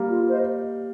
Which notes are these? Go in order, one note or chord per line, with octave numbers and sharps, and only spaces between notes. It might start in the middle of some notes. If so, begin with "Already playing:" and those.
Already playing: G3 A#3
F4
C5 D#5